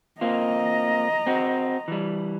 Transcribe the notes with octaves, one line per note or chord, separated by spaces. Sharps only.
A#3 C4 F4 D#5 A#5
C4 F#4
E3 G3